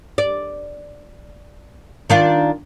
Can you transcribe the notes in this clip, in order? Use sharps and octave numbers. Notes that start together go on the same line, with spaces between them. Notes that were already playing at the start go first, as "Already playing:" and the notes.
D5
D#3 D4 F4